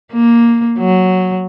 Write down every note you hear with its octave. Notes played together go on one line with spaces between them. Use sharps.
A#3
F#3